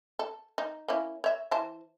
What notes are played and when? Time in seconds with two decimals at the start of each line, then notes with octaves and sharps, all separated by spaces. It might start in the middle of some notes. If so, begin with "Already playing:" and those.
0.19 A4
0.58 D#4
0.88 A#3 C#4 E4
1.24 C#5 E5
1.51 E3 C5 A5